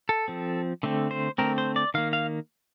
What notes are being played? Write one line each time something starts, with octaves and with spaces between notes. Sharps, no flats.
A4
F3 C4
D3 A3 C4
C5
D3 A3 C4 A#4
C5
D5
D#3 A#3 F5
F5